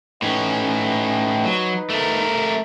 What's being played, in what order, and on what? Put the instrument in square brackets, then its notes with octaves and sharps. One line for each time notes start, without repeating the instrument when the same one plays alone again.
[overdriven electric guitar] A2 C#4 [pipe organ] D#4 B4
[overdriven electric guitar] F#3
A3 A#4